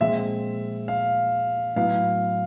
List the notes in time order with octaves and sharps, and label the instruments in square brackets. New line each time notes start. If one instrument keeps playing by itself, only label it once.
[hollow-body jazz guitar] A#2 F3 G#3 C4 [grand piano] E5
[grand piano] F5
[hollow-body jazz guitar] A2 F#3 B3 E4 [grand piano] F5